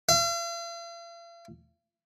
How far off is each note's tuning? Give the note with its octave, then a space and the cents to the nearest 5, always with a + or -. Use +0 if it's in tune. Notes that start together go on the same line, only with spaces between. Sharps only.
F5 -45